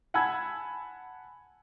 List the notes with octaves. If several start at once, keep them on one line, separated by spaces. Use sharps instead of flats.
F#5 G#5 A5 B5 E6 G#6